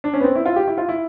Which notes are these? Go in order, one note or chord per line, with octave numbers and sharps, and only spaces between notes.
D4
C#4
B3
C4
E4
F4
G4
E4
F4
E4